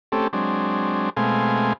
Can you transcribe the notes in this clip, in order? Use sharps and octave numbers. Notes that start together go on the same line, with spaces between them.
A3 C4 C#4 G4 A4
F#3 G#3 C4 D4
B2 G#3 A3 C4 F5 G#5